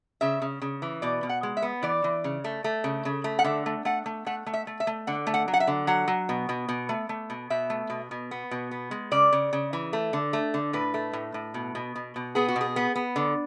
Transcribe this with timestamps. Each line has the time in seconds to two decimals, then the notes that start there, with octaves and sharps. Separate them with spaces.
0.21 C#3 E5
0.42 C#3
0.62 C#3
0.82 E3
1.02 B2 D5
1.23 B2
1.29 F#5
1.43 G#3
1.57 E5
1.62 B3
1.83 E3 D5
2.04 E3
2.24 C#3
2.44 A3
2.64 A3
2.84 C#3
3.05 C#3
3.24 A3
3.39 F#5
3.44 D3 E5
3.66 A3
3.85 A3 F#5
4.06 A3
4.26 A3 F#5
4.46 A3
4.53 E5
4.67 A3
4.80 E5
4.87 A3
5.07 D3 F#5
5.27 A3
5.34 F#5
5.48 F#3
5.54 F#5
5.60 E5
5.67 D3
5.87 F#3 F#5
6.08 F#3
6.29 B2
6.49 B2
6.69 B2
6.89 A3
7.09 A3
7.30 B2
7.50 B2 E5
7.70 A3
7.90 B2
8.11 B2
8.31 B3
8.51 B2
8.71 B3
8.91 G#3
9.11 C#3 D5
9.32 C#3
9.53 C#3
9.73 E3
9.93 A3
10.13 D3
10.33 A3
10.54 D3
10.73 A2 B4
10.94 A3
11.13 A2
11.34 A2
11.54 B2
11.75 B2
11.96 B2
12.16 B2
12.35 B3 G#4
12.49 F#4
12.56 B2 G#4
12.76 B3
12.96 B3
13.16 D3